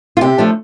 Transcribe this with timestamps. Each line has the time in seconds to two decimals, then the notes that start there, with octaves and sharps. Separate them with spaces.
0.17 F4
0.21 C3 G4
0.38 F3 A3 D4